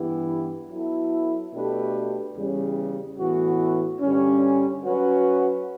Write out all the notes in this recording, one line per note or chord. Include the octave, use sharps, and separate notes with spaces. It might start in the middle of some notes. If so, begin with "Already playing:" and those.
Already playing: G2 E3 B3 E4 G4
F#3 B3 E4 A4
B2 A3 D4 G4 B4
E2 C#3 G3 C#4
A2 E3 B3 F#4
G2 D3 G3 C#4
F#3 C#4 F#4 B4